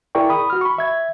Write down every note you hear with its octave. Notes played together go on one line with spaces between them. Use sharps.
E4 G#4 A#4 D5 G5 C#6
B5 D#6
F#4 F6
B5 C#6
E5 G#6